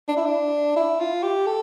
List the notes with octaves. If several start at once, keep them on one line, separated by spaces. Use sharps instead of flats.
D4
E4
D4
E4
F4
G4
A4